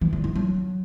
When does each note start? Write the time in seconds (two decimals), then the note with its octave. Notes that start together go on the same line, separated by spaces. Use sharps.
0.01 E3
0.13 D3
0.24 E3
0.36 F#3